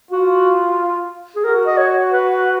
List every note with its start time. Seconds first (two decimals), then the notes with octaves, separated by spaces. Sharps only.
0.11 F4 F#4
1.36 G#4
1.44 F#4 A#4
1.66 D#5
1.78 C#5
2.11 B4